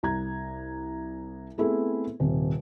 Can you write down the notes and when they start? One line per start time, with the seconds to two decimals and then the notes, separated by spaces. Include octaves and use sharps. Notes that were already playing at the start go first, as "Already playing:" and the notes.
0.03 C2 A#5 G#6
1.58 A3 B3 C4 E4 G#4 A4
2.20 D#1 C3